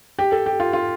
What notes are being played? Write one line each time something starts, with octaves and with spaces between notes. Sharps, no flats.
G4
A4
G4
F4
F4